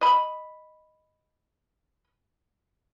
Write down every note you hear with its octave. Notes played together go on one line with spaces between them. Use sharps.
D#5 B5